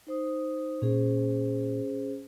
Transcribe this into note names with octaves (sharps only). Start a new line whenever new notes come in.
D#4 C5 D#6
A#2 C#4 G#4 C5